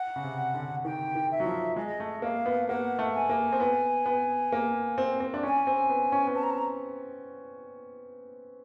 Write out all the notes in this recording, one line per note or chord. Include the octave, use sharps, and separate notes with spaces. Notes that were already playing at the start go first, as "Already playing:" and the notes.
Already playing: F#5
C#3
C3
D3
D#3 G5
D#3
E5
F#3
F3
G#3 D#5
A3
A#3 F5
B3
A#3 F#5
A3
G#5
A#3
C4
B3
B3
A#3
C4
C4
D4
C#4 G#5
C4
B3
C#4
B3
C4 A5
A#5
A5
A#5